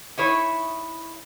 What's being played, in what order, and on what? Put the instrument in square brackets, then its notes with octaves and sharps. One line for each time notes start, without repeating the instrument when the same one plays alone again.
[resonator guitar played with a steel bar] D#4 E4 C#5